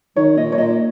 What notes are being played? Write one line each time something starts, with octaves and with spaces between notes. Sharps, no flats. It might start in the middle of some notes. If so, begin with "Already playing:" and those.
D#3 C#5
A#2 D#5
C#5
A#2 D#5